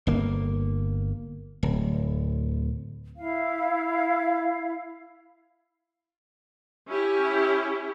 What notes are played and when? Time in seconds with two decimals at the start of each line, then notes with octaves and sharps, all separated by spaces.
0.07 G1 A#3
1.63 D1
3.17 E4 F5
6.88 C#4 E4 G4